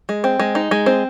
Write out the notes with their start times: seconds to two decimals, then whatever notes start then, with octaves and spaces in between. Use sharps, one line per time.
0.09 G#3
0.24 C4
0.39 G#3
0.55 D#4
0.71 G#3
0.86 C4